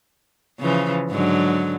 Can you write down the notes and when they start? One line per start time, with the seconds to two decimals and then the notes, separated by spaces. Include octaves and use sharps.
0.60 C#3 E3 F3
1.10 G#2 D3 F#3